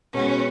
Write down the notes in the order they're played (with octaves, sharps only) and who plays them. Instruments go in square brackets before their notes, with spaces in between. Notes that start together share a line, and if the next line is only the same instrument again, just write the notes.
[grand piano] B2 G#3 B3 F#4 [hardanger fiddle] C#4